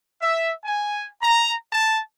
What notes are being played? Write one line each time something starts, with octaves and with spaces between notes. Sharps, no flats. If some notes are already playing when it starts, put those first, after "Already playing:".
E5
G#5
A#5
A5